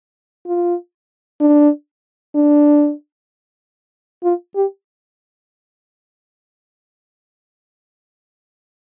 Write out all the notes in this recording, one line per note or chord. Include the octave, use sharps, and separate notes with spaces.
F4
D4
D4
F4
G4